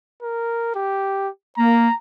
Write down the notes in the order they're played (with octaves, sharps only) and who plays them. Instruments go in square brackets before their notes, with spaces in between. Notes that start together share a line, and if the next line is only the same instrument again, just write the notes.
[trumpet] A#4
G4
[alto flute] A#3 [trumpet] A#5